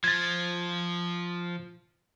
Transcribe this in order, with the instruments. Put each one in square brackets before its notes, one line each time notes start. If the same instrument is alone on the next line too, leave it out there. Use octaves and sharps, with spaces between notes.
[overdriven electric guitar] F3 [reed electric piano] G#6 A6